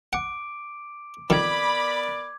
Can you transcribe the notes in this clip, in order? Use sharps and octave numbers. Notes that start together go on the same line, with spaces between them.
F#5 D6 D7
F2 D#3 B3 A#4 D5 B5 D6 G#6